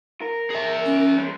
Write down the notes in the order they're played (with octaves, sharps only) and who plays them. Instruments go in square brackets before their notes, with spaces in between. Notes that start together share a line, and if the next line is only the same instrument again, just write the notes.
[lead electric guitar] A#4
[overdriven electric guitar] G#4 E5
[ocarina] C#4
[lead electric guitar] G#3 C#4